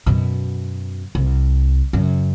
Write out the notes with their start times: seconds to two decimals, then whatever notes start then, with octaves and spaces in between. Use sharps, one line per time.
0.06 F#2 B2
1.15 C2
1.93 F#2 C#3